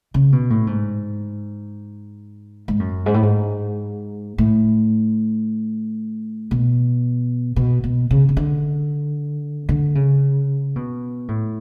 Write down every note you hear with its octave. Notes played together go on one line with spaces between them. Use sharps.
C#3
B2
A2
G#2
G#2
F#2
G#2
A2
G#2
A2
B2
B2
B2
C#3
C#3
D3
D3
C#3
B2
A2